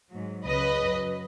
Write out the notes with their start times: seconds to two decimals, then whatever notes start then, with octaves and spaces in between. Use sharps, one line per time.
0.10 F#3
0.15 G#2
0.45 C#2 C#3 F#3 B4 D#5
0.80 F#2 F#3